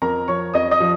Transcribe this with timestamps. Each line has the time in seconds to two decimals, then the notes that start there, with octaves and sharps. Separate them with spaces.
0.02 F2 A#4 A#5
0.28 F3 C#5 C#6
0.54 F2 D#5 D#6
0.71 D#5 D#6
0.80 F3